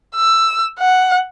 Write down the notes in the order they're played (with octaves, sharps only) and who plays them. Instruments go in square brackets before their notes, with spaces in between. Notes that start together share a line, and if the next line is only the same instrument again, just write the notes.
[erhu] E6
F#5